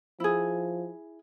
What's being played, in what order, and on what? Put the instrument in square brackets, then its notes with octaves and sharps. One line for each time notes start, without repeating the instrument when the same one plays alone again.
[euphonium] F3 [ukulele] E4 G#4